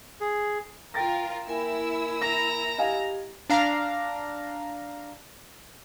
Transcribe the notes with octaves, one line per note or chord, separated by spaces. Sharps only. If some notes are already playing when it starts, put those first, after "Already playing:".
G#4
F4 A#4 G5 A6 A#6
A#3 E4 A#4 G#5 E6
A#5 A#6
G4 D#5 F5 G#5
D4 F5 A#5